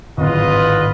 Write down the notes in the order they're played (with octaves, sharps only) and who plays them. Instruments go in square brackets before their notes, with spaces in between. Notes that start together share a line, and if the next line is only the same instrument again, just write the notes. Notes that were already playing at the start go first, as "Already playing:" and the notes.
[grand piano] D1 G#1 [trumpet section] F4 B4 D#5